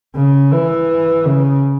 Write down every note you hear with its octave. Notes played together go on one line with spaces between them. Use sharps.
C#3
E3
C#3